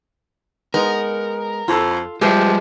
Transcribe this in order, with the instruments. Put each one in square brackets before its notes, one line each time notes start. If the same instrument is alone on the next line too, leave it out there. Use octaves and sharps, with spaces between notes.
[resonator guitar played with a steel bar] G#3 B3 D#4 [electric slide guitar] A#4
[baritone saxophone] F2 [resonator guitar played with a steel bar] F4 A4
[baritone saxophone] F3 [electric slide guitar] G3 G#3 [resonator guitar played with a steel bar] G4 B4 E5